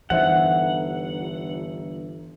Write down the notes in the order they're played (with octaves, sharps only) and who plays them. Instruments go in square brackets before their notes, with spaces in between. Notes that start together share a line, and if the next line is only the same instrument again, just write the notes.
[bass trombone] G1 [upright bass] E3 [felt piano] D#4 C5 E5 [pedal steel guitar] F#5